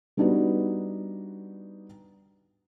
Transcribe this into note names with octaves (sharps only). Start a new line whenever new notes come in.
G3 B3 D4 D#4 F#4 B4